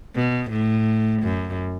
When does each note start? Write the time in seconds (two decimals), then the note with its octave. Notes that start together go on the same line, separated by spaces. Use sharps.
0.16 B2
0.51 A2
1.23 F#2